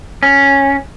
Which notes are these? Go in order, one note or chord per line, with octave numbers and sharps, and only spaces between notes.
C#4